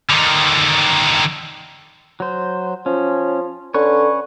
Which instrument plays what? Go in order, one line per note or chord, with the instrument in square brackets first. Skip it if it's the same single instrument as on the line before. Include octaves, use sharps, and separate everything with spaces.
[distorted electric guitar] D3 D#3
[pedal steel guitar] F#3 C5
[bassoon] F3 [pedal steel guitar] C#4
[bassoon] D3 [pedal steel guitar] C#4 B4 C#5